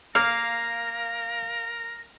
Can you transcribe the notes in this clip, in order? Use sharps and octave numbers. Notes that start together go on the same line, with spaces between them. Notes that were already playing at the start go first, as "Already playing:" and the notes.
A#3 A#4 F5